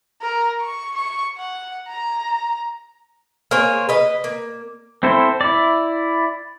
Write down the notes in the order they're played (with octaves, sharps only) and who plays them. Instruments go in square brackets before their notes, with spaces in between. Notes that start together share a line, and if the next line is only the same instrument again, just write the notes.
[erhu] A#4
C#6
C#6
F#5
A#5
[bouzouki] A#3 G#4 C5 C#5
B4 D#5
A#3
[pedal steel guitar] C4 E4 A4 C5
E4 D5